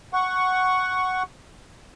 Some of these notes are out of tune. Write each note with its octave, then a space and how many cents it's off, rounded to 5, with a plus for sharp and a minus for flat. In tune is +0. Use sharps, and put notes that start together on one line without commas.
F#5 +0 C#6 +0